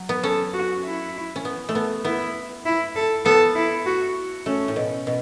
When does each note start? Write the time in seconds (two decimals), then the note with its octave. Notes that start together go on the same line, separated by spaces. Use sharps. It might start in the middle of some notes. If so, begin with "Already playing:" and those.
Already playing: F#3
0.09 B3
0.23 C#4 A4
0.53 F#4
0.85 E4
1.36 C#4
1.45 B3
1.69 A3
1.75 B3
2.04 B3 E4
2.65 E4
2.95 A4
3.25 B3 A4
3.55 E4
3.86 F#4
4.46 A3 C#4
4.68 A2
4.76 B2
5.07 B2